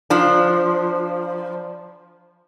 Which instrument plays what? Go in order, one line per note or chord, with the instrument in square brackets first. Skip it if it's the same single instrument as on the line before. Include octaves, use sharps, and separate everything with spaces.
[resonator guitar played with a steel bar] F3 D4